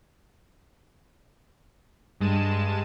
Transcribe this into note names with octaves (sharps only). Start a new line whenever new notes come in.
G2 G#3 A5 D#7 E7